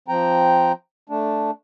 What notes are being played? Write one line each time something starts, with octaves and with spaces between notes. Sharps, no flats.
F3 C4 G5 A#5
A3 D4